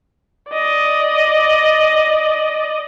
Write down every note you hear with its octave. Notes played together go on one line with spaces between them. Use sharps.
D5 D#5